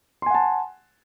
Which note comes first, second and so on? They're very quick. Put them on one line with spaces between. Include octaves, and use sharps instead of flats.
C6 G#5 F#5 A5